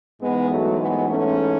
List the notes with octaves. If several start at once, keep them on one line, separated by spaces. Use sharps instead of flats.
G#2 E3 G#3 B3
F#3 A3
G#3 B3
A3 C#4